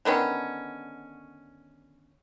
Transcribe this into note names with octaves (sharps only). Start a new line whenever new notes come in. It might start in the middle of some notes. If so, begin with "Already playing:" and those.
D3 D#3 B3 C#4